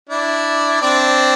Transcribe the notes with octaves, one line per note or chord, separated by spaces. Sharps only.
D4 E4
C4 D4